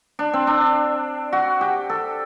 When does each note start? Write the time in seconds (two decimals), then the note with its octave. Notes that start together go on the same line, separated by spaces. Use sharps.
0.19 D4
0.34 C4
0.47 D4
1.33 F#4
1.61 G4
1.90 A4